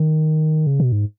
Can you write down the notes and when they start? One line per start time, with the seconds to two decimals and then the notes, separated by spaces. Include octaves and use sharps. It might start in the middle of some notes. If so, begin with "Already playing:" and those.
Already playing: D#3
0.67 C#3
0.80 B2
0.92 G#2